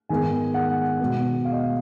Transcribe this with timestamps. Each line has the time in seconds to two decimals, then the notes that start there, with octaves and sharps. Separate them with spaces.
0.09 G#2 D#3 G#3 B3 G#5
0.54 F#5
0.99 B2 G#3 B3
1.45 F5
1.52 D#5
1.60 F5